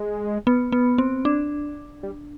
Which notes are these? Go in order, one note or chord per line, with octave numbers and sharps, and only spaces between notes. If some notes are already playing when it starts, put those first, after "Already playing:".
Already playing: G#3
B3
B3
C4
D4
G3